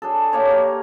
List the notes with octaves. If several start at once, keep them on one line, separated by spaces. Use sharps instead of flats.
D4 G#4 A4
A#3 G4 C#5 C#6
A#4